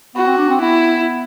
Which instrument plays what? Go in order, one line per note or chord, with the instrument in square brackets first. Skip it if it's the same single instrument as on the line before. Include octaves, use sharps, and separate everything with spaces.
[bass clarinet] B3 [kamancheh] F#4
[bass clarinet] C4
D4
C4
[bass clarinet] B3 [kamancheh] E4